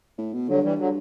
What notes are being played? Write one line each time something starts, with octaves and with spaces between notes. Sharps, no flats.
A2
B2
G2 D3 F#3
E3 G3
D3 F#3